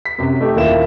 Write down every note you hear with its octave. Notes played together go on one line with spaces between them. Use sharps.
B6
F#2 C3
A3 D#4 G4
D#1 D#2 A#3 E4 F4 E7